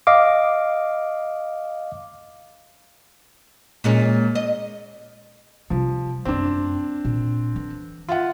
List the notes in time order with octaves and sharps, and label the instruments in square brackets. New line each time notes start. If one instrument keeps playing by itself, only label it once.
[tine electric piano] D#5 F5 D6
[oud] A#2 G#3 C#4
D#5
[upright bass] C3 G3 [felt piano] F3
[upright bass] F#2 A3 [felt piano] C4 D4
[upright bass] A#2
D3 E3
[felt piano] F4 E5 F#5